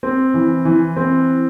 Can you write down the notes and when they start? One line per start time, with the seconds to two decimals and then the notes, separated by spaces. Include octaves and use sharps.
0.03 C4
0.34 E3
0.65 E3
0.96 C4